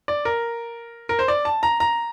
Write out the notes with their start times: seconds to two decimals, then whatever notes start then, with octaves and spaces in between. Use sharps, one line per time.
0.08 D5
0.25 A#4
1.09 A#4
1.19 C5
1.28 D5
1.45 A5
1.63 A#5
1.80 A#5